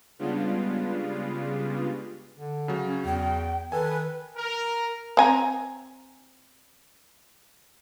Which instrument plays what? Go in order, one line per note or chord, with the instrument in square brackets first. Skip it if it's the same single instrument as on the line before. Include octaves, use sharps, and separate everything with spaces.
[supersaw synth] C#3 G3 G#3 B3 D4 F4
[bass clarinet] D3
[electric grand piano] C#3 F#3
[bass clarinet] C#4
[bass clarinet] E2 [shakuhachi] G5
[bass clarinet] D#3 [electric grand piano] A4 G#5 [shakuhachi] B4
[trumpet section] A#4
[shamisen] C4 G#5 A#5